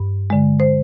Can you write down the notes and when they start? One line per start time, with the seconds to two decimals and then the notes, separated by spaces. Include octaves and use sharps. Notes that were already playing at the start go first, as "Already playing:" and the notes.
Already playing: G2
0.30 D3 G#3
0.60 C5